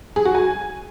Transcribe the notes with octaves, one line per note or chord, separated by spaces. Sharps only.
G#4
F#4
G#5